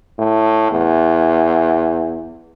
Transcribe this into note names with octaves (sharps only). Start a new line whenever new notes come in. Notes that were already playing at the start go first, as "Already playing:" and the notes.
A2
E2